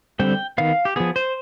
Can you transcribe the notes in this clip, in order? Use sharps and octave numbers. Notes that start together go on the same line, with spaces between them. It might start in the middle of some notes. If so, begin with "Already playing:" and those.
D3 G3 C4 G5
D#3 B3 F5
G4
F3 B3 G#4
C5